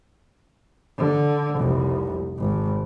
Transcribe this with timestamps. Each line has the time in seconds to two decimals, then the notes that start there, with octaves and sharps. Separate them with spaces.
0.98 D3
1.58 F1 C2
2.39 G#1